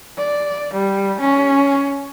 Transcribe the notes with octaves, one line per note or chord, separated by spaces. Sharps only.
D5
G3
C#4